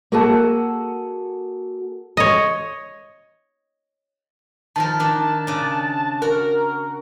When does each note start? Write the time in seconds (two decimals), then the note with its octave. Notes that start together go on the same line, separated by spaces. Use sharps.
0.12 A#3 F#4 G#4 A4 F#5 A5
2.17 C#5 D#5
4.76 D#3 F3 A#4 A5
5.00 D#3 D4
5.47 C#3 D4
6.22 F#4 A#4